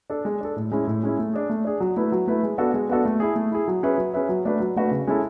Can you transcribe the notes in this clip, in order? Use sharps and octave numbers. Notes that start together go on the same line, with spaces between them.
D4 A4
G#3
D4 A4
A2
G#3 C#4 E4
A2
G#3 C#4 E4
A3
D4 G#4
A3
D4 G#4
F#3
A3 E4 B4
F#3
A3 E4 B4
G#3
B3 D4 F#4 A4
G#3
B3 D4 F#4 A4
A3
E4 G#4
A3
E4 G#4
F#3
C#4 G#4 B4 E5
F#3
C#4 G#4 B4 E5
F#3
A3 D4 F#4 B4
F#3
A3 D4 F#4 B4
C#3
G#3 C#4 E4 A4